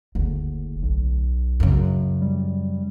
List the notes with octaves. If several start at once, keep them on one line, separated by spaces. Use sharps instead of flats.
F#1 D2
B1
F#2 C#3
G3